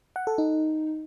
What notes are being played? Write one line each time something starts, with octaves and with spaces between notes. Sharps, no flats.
F#5
A4
D#4